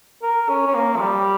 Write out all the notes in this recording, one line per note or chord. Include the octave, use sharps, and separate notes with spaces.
A#4
C#4
C#4
A#3
F3
G3